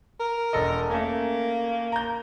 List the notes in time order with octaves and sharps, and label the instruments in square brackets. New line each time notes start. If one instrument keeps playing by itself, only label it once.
[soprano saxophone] A#4
[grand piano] E1 A4 D#5
[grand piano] A3 C#4 [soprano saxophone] A#3
[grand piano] A#5 G6